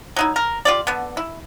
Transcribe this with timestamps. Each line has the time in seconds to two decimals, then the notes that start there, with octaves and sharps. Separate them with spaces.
0.16 F#3 D#4 E4
0.36 A#4
0.65 F4 G4 D5
0.87 D3 B3
1.17 E4